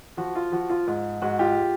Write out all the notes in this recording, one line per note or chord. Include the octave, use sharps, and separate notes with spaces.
F3 F#4
F4
F3 F#4
F4
G#2
G#2 F#4
F4 G4